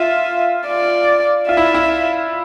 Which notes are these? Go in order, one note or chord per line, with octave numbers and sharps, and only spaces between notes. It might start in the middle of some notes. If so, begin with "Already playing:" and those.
Already playing: F4 E5
D5
F4 E5
E4
E4